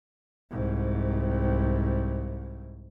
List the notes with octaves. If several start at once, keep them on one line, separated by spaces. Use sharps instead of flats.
C2 G#2